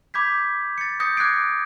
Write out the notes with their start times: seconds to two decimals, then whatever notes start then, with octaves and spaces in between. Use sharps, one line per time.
0.14 B5 D6 G6 G#6 B6
0.78 A6 C#7
1.00 D#6 G6 A#6 C#7
1.17 D6 F#6 G#6 C7 D7